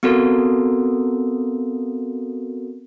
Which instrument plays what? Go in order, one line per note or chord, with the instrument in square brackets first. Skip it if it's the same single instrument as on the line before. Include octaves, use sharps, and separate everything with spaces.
[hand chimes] B3 C4 F#4 A4 A#4